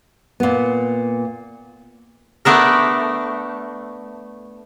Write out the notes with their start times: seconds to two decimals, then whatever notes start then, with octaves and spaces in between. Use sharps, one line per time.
0.40 A#2 B3
2.45 A3 B3 D4 A#4